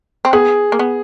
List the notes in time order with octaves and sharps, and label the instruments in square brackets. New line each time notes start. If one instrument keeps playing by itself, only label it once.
[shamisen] C4
[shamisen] B3 [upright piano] G#4
[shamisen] A#3
B3